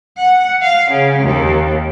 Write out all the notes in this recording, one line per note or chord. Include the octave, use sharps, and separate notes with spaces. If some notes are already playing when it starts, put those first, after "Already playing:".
F#5
F5
C#3
D#2